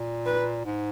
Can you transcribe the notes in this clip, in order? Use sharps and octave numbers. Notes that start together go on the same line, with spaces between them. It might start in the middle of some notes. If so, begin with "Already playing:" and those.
Already playing: A#2
B4
G#2